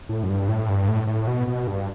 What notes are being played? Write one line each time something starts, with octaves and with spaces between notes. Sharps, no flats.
A2
F#2
G2
A2
G2
A2
A2
B2
B2
G2